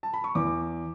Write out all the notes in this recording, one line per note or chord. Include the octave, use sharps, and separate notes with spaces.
A5
B5
C#6
E2 D6